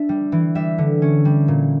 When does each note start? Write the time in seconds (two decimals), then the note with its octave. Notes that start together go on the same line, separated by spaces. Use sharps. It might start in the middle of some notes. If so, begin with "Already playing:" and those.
Already playing: D4 E5
0.09 G3
0.32 E3
0.55 G3 E5
0.78 D3
1.02 C#4
1.25 G3
1.48 A#2